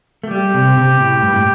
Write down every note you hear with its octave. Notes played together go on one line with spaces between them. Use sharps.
A3
G3 G4
C3
C3
A2
G2
A2